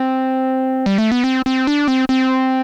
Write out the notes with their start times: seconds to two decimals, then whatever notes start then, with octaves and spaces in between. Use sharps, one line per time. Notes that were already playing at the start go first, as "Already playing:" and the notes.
Already playing: C4
0.86 G3
0.98 A3
1.12 B3
1.24 C4
1.46 C4
1.67 D4
1.88 C4
2.09 C4